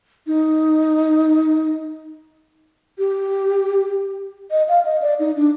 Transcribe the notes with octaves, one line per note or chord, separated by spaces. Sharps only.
D#4
G4
D#5
F5
D#5
D5
D#4
D4